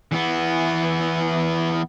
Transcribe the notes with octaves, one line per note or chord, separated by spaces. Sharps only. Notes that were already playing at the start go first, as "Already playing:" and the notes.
E3 B3